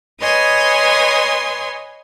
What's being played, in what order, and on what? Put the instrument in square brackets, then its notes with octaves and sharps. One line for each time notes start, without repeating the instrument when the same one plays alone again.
[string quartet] B4 C#5 D#5 G#5 C6 D#6